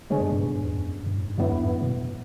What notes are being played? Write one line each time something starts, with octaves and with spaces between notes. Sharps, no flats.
C#3 G#3 B3 D4 G#4 C#5
F#2
G#2
A2
G#2
E2
F#2
F#2
A2
G#2
F#2 D3 F#3 B3 E4
E2
G#2
F#2
B2
A2